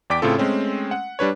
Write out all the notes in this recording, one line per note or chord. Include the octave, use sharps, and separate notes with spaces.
E2 D5 G5 D6 B6 D7
A2 C#3 C4 F4 A4
G#3 A3 C4 C#4
F#5
G3 D4 B4 C#5